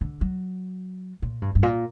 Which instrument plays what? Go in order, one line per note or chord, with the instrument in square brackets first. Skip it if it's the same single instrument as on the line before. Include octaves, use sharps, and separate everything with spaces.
[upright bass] D3
F#3
A#2
G2
G2
A#2